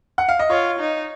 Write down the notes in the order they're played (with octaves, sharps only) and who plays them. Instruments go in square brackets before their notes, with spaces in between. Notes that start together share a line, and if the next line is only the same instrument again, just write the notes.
[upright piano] F#5
F5
D#5
[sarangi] F4 [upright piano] C#5
[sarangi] D#4